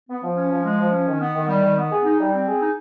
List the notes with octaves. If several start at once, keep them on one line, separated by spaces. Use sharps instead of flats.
B3
F3
C#4
F3
G#3
F3
C#4
D#3
B3
D#3
G3
D#3
B3
G#4
D#4
G3
C4
G#4
D#4